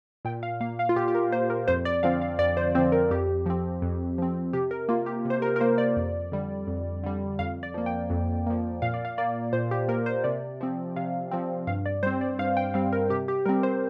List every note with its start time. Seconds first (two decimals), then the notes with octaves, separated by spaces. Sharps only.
0.25 A#2 G5
0.43 F5
0.61 A#3 F5
0.79 F5
0.89 F4
0.96 A#2 G4
1.08 G4
1.15 A#4
1.32 A#3 C5
1.50 A#4
1.68 F2 C5
1.85 D5
2.03 D3 F3 C4 F5
2.22 F5
2.39 F2 D5
2.57 C5
2.75 D3 F3 C4 C5
2.92 A#4
3.11 F2 G4
3.46 F3 C4
3.82 F2
4.18 F3 C4
4.53 C3 G4
4.71 A#4
4.89 A#3 F4
5.06 G4
5.25 C3
5.30 C5
5.42 A#4
5.56 A#4
5.60 A#3 C5
5.78 D5
5.96 F2
6.32 D3 G3
6.67 F2
7.04 D3 G3
7.39 F2 F5
7.63 D5
7.74 F3 A#3
7.86 G5
8.10 F2
8.47 F3 A#3
8.82 A#2 F5
8.94 D5
9.05 F5
9.18 A#3 D5
9.53 A#2 C5
9.71 G4
9.88 A#3 A#4
10.06 C5
10.24 C3 D5
10.61 F3 C4
10.96 C3 F5
11.31 F3 C4
11.67 G2 F5
11.86 D5
12.03 G3 C4 C5
12.21 D5
12.39 G2 F5
12.57 G5
12.74 G3 C4 F5
12.92 A#4
13.10 C3 G4
13.28 G4
13.45 G3 C4 A#4
13.63 C5